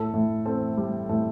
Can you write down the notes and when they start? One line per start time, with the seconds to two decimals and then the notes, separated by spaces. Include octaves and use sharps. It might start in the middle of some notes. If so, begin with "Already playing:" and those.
Already playing: A2 A4
0.14 A2
0.46 C4 A4
0.77 G3
1.09 A2 A4